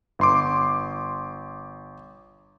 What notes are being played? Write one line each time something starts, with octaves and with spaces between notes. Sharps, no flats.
G1 C6 D6